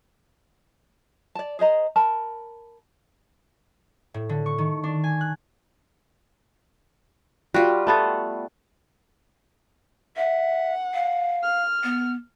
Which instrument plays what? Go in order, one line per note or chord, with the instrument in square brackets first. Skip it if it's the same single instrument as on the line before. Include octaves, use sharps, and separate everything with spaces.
[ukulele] D5 A5
G#4 C5 D#5 A#5
A#4 A5 B5
[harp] A2
D3
C#6
D#3
D4
G#5
F#6
[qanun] G3 F4 [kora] F#4
[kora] A3 B3 A4
[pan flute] E5 [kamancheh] F#5
[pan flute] F5
[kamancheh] F6
[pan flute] B3